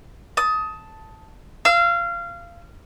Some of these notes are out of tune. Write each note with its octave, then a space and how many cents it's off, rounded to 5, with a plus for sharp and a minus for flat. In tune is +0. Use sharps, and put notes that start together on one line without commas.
A5 +0 D#6 +20
F5 -20 E6 +0